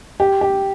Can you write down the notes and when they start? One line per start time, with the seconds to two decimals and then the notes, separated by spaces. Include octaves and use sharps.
0.20 G4
0.41 G4